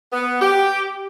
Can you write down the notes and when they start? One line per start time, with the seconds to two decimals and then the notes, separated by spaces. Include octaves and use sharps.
0.12 B3
0.41 G4